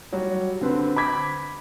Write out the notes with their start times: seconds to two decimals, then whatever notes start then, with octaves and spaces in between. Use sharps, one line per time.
0.13 F#3 G3
0.61 D3 C4 B4
0.96 B5 D6 G#6 B6